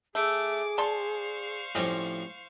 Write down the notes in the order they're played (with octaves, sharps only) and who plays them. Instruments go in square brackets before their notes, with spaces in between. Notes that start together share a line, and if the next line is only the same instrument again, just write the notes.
[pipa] A3 [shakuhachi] G#4 [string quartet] D6
[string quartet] C5 F5 C#6 [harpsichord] D5 [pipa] A5 C6
[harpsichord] A2 F3 [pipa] G3 C4 C#4